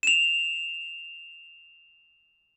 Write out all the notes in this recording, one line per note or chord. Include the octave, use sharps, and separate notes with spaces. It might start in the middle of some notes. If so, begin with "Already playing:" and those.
E7 F7